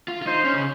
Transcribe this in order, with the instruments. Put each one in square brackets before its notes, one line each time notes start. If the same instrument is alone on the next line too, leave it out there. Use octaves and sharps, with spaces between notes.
[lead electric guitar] F4
F4
[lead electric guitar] D#4 [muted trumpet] C5
[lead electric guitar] C#4
C#3